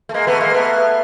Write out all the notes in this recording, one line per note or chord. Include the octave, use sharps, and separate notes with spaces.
A3
G#3 A#3
A3 B3
G#3 A#3
A3 B3